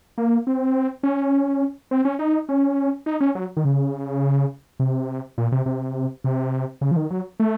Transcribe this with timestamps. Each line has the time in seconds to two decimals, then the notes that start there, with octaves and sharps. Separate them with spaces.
0.18 A#3
0.47 C4
1.03 C#4
1.91 C4
2.05 C#4
2.19 D#4
2.49 C#4
3.06 D#4
3.21 C#4
3.35 F#3
3.57 D#3
3.65 C#3
4.80 C3
5.38 A#2
5.52 C3
5.66 C3
6.24 C3
6.81 C#3
6.91 F3
6.96 D#3
7.10 F#3
7.40 A3